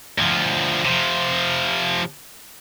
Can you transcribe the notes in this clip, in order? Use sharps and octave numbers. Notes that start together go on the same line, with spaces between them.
D2 F3
C3 F3